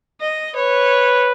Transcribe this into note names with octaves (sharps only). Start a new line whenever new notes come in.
D#5
B4 C#5